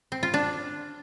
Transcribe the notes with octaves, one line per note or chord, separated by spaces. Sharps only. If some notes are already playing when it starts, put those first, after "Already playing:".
C4
F4
D4